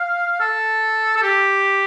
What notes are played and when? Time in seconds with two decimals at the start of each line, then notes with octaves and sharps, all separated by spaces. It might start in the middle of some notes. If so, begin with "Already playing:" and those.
Already playing: F5
0.40 A4
1.17 A4
1.22 G4